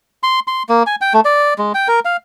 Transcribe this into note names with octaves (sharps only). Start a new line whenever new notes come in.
C6
C6
A#3
G#5
G5
A3
D5
G#3
G5
A#4
F5